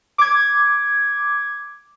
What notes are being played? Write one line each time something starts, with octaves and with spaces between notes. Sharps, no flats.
D6 G#6